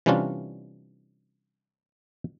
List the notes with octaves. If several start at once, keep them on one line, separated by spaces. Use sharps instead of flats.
C3 E3 G3 C#4 D4 F4